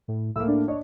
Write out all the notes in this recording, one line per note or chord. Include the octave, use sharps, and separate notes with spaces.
A2
A2 A#3 E6
D4
D4 C#5 D#5